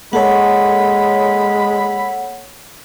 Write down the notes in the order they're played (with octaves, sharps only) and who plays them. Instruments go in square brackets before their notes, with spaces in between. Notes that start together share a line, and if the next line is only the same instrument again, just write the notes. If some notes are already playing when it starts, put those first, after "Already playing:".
[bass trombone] G#3 [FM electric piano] A#3 A4 C#5 [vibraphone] F#5 [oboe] B5